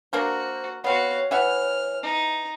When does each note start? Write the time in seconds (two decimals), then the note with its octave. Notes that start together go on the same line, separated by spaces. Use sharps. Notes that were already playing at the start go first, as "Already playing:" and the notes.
0.13 A#3 D4 F#4 A#4 C5
0.84 B3 C4 F#4 C#5 F5
1.31 E3 E5 F#5 F6
2.03 D#4